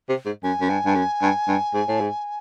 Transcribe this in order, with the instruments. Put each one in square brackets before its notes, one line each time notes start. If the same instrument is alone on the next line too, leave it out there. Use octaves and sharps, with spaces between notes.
[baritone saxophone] C3
G#2
[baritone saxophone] F#2 [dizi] G#5
[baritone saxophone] F#2
G2
G2
F#2
G2
G2
G#2
A2
G#2